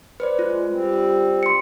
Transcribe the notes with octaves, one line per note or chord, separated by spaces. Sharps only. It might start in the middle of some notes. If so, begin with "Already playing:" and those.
B4 C5 D5
G#3 F4
G3 C4
C6 C#7